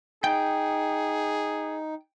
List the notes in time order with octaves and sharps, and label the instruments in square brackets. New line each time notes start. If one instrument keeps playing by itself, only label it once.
[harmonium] D#4 [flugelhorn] G#4 [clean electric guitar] G5